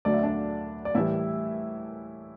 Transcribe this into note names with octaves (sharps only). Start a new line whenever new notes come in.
D2 D3 F#3 A3 D5
E5
D4 D5
D5
A2 E3 G3 E4 E5